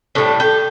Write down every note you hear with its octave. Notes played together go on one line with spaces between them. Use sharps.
A2 E3 G3 D4
G4